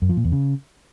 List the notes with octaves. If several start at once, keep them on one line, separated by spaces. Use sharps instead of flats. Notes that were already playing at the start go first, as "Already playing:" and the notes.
F#2
F3
A#2
E2
C#3